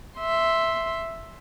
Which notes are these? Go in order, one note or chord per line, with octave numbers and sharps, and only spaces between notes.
E5 C6